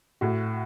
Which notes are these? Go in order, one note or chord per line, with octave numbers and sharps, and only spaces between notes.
A2 F#4